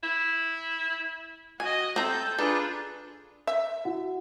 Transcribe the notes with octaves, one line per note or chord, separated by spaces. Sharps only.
E4
F#4 D#5 G#5
C4 A4 A#5 G6
D4 F4 G#4 A4 B4 D5 A#5
E5
E4 F#4 F#5